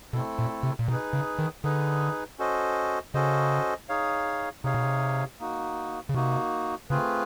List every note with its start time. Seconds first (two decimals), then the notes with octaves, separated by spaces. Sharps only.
0.13 B2 A3 C4 E4 A4
0.39 A#2
0.63 C3
0.79 A#2
0.88 B2 D#4
0.91 G#4 B4
1.13 C#3
1.39 D#3
1.64 D3 D#4 G#4 B4
2.38 C#4 F#4 A4 C5 D#5
3.14 C#3 C#4 F#4 A4 C5 D#5
3.89 D#4 G#4 C#5 F5
4.64 C3 D#4 G#4 C#5 F5
4.74 B2
4.84 C3
5.40 A#3 D#4 F#4
6.09 C#3
6.14 C3 A#3 D#4 F#4
6.90 C#3 A3 C4 F4 G#4 B4